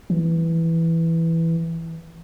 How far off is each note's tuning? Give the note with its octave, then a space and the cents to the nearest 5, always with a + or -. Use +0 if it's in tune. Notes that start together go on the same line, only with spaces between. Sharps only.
E3 +0